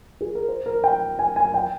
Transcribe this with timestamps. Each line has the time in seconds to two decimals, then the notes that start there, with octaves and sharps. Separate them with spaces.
0.21 G#4
0.35 A#4
0.48 C5
0.66 A#4
0.84 G5
1.19 G#5
1.36 G#5
1.54 G5